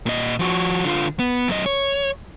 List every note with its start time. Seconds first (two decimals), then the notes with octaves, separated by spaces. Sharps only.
0.06 A#2 D#5
0.39 F3 F#4
0.84 D3 F4
1.19 B3
1.48 F#2 D#5
1.66 C#5